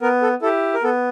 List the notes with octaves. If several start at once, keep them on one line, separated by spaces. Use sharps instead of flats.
B3 A#4
A4
E4 G4 A4
A#4
B3 A4